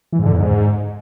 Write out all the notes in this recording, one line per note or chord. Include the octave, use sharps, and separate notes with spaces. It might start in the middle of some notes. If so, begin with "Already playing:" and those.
E3
G#2
D3
E2
G#2